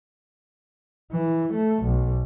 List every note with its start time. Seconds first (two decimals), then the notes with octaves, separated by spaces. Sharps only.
1.12 E3
1.53 A3
1.83 B1